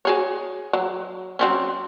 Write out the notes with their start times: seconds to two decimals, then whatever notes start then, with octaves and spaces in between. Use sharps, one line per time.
0.05 F#4 G#4 C#5
0.73 F#3
1.39 F#3 C4 C#4